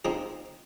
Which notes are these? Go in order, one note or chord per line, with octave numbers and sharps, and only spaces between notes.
F3 C4 D#4 G#4